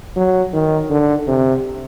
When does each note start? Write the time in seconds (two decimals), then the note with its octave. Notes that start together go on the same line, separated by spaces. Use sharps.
0.16 F#3
0.53 D#3
0.90 D3
1.28 C3